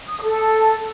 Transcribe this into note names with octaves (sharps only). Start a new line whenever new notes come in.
D#6
A4